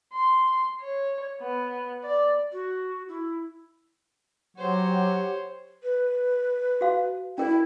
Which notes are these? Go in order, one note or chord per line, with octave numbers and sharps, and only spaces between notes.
C6
C#5
B3
D5
F#4
E4
F#3 G4 C5 C#5 F#5
B4
F#4 F5
C#4 E4 A#4